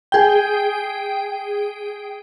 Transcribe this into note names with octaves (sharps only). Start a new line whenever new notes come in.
G#4 G5